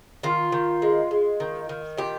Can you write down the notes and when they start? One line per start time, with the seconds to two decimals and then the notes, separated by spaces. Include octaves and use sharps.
0.23 D#3 F4
0.52 D#3
0.82 G#3
1.11 G#3
1.40 D#3
1.69 D#3
1.97 A#2 G4